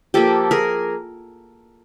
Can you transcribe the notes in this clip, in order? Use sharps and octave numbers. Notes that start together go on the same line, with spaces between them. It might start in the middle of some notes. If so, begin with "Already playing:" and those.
F3 A#3 G4 A4
G#4 A#4